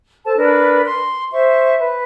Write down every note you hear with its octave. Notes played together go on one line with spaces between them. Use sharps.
A4 C5 A5
D4 A#4 B4
C6
C5 E5 C#6
B4